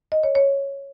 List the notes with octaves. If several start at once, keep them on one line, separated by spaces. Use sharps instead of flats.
D#5
C#5
C#5